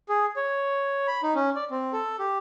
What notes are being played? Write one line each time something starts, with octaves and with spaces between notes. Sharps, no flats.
G#4
C#5
B5
D#4
C#4
D5
C4
A4
G4